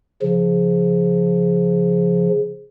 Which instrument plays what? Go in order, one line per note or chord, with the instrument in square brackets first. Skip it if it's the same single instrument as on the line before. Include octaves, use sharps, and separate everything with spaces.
[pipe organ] C#3 F3